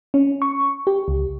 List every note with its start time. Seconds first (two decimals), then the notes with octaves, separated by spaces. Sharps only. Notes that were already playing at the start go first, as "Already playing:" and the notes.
0.14 C#4
0.42 C#6
0.87 G4
1.08 C#2